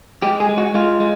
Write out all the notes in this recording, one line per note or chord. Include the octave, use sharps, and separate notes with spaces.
G#3 G4
G#4
G#3
F#4
G#3 F4
G#3